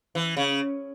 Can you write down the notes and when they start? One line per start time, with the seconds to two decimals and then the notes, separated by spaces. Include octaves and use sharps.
0.15 E3
0.37 C#3